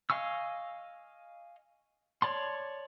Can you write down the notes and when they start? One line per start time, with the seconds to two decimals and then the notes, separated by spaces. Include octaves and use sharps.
0.10 D#5 F5 G#5 C#6 E6
2.22 C#5 D5 A5 C6